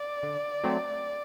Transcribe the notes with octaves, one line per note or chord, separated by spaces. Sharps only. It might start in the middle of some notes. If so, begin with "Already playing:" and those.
Already playing: D5
D3
F#3 A3 C4